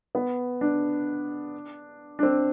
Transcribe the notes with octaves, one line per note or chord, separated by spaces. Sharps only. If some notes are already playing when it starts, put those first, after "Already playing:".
B3
D4
D4
C4